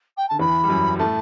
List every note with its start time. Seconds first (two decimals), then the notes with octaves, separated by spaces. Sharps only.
0.17 G5
0.28 D3 A5
0.39 E2 E3 B5
0.64 G3
0.69 F#2 F#3
0.95 G3
0.99 A2 A3 A5